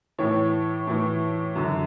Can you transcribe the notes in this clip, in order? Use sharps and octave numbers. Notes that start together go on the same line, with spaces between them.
A2 E3 C#5
A2 E3
F#2 D3